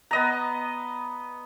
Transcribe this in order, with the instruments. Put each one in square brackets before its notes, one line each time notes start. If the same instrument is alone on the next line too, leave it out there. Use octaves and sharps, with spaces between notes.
[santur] B3 D#5 A#5